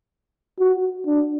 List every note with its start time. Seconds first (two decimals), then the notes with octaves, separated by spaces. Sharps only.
0.59 F#4
1.06 D4